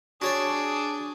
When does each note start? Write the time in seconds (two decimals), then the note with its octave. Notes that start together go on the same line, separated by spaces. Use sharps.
0.22 D4 F#4 G#4 C#5 D5